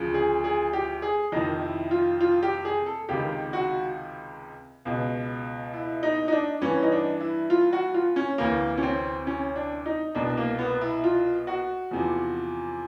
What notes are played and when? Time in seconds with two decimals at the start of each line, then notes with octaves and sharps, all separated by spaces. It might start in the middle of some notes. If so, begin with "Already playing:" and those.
Already playing: D2 C#3 F3
0.14 G#4
0.44 G#4
0.73 G4
1.02 G#4
1.32 F2 C3 D#3 D#4
1.62 E4
1.91 F4
2.21 F4
2.43 G4
2.65 G#4
2.86 A4
3.09 C#2 C3 D#3 G4
3.53 F#4
4.85 C#2 B2
5.74 E4
6.03 D#4
6.28 D#4
6.32 D4
6.61 G2 E3 C#4
6.83 D#4
6.92 D4
7.21 E4
7.50 F4
7.73 F#4
7.94 F4
8.16 C#4
8.38 D2 C3 E3 A#3
8.77 C#4
8.83 C4
9.27 C#4
9.56 D4
9.86 D#4
10.15 C2 B2 D4
10.37 A#3
10.59 B3
10.81 E4
11.04 F4
11.47 F#4
11.91 E2 C3 F3